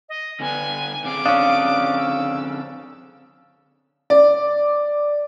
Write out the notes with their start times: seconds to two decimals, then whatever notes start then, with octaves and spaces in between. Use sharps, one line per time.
0.09 D#5
0.40 D3 B3 D4 G#5
1.04 D3 C4 G#4 D6
1.26 C#4 D4 F5 D#6
1.98 E6
4.10 D5